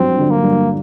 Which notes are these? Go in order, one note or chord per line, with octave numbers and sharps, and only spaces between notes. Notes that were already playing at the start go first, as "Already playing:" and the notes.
Already playing: G2 F#3 C4
D3
A#3
G2